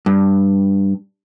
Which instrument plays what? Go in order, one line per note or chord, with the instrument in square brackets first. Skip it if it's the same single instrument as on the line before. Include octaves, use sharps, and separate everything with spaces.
[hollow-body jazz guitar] G2